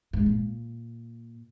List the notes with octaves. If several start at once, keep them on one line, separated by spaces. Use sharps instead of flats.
G#2
A#2